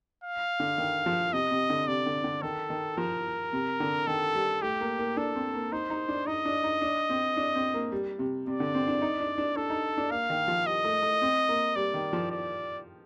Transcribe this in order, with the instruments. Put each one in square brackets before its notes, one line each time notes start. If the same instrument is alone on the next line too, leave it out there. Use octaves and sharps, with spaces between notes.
[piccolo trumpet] F5
[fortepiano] D3
D#3
F3
[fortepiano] C3 [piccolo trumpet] D#5
[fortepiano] C3
D3
[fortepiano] C3 [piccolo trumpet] D5
[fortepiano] D3
D3
[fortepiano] D#3 [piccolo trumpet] A4
[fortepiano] D#3
[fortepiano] F3 [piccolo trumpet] A#4
[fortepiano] C3
D3
[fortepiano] D#3 [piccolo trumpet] A4
[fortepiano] G3
[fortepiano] A3 [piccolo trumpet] G4
[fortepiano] A#3
A#3
[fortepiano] D4 [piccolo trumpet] A4
[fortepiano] C4
A#3
[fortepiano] D#4 [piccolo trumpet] C5
[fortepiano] D#4
D4
[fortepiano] D#4 [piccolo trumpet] D#5
[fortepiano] D4
D#4
D4
C4
D4
C4
A#3
G3
C3
[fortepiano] C3 [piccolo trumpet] D5
[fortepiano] D3
C4
D4
D#4
D4
D4
[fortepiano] D4 [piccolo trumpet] A4
[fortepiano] D#4
D4
[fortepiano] A#3 [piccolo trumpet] F5
[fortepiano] D#3
F3
[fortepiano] G3 [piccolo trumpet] D#5
[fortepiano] A3
A3
C4
A#3
[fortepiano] G3 [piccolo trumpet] D5
[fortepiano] D#3
F3
[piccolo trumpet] D5